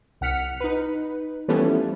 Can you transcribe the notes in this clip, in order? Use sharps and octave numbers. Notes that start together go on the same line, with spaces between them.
C2 F#5 F6 B6 C#7
D#4 B4
E3 F3 G3 A3 B3 C#4